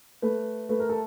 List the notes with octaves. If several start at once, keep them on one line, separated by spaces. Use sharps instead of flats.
A3 B4
A3 B4
A#4
A4